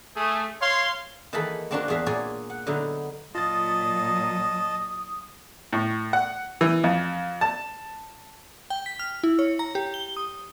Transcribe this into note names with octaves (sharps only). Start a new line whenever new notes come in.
A3 G#4
C#5 F5 C6
D#3 E3 A#3 G#4 A4 B5
A#3 C4 D4 F4 F#4 A#4
E2 F#4 G#4 E5 F5
A#2 G#4 C#5 D5 G#5
F#5
D3 F#3 B3 D#4 E4
A#2 F#3 F4 D#5 A5 D#6 A6
A2
F#5
E3
F2
A5
G5
B6
F6
E4
C#5
A#5
G4
G7
D#6